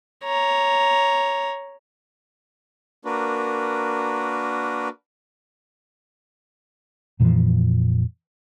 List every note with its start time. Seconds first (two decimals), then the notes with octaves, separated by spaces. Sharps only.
0.24 C#5 A#5
3.05 A#3 D4 F#4 A#4 B4
7.20 F2 A#2 E3 F3